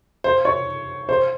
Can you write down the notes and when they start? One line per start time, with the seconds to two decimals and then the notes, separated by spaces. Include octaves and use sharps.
0.24 C5
0.45 C#5
1.09 C5